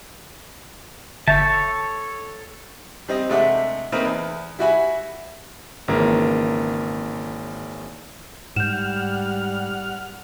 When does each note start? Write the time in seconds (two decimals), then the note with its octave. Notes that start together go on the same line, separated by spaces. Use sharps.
1.28 G1 A4 C#5 E5 A5 G6
3.08 G3 C4 D#5
3.29 C3 G#3 A3 D4 E5 F#5
3.92 A3 A#3 C4 D#4 A#4 B4
4.04 E2
4.59 G3 E4 F#4 E5 G#5 B5
5.88 G#1 C#3 E3 A#3 A#4
8.56 G#2 G3 F#5 F6 G6 E7